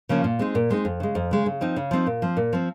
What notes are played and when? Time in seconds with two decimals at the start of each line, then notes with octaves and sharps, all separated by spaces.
0.09 C#3 F3 A#3 C#4
0.24 A#2
0.39 G#3 C4 D#4
0.55 A#2
0.70 G#3 C4 D#4
0.85 F2
1.00 C#3 G#3
1.15 F2
1.31 C#3 G#3
1.46 C#3
1.61 F3 C4 D#4
1.76 C#3
1.91 F3 C4 D#4
2.06 A#2
2.22 F3 C4
2.37 A#2
2.53 F3 C4